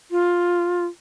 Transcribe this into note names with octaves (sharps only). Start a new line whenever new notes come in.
F4